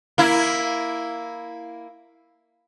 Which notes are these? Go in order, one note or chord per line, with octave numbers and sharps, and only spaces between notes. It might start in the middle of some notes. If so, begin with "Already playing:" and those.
A#3 E4